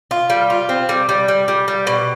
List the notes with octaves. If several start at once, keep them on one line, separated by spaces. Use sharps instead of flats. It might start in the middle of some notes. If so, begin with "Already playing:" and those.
F4
G3
F4
C4
G3
G3
G3
G3
G3
B2